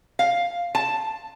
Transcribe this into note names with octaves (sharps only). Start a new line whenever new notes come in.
F5
A5